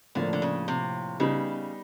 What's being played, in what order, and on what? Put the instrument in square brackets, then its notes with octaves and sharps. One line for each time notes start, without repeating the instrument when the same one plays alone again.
[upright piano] A2 F3 A#3 [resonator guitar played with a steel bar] D3
[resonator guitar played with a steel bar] D3
C#3
C3
[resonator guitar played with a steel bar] C#3 [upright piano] G3 B3 D#4